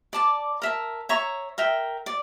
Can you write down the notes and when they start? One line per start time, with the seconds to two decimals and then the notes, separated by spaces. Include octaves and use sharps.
0.13 D5 A5 D6
0.62 A#4 E5 A5
1.09 C#5 E5 A#5 C#6
1.58 A#4 E5 G5
2.06 D5